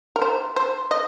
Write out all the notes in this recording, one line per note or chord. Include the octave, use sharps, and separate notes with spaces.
A#4
C5
C5
D#5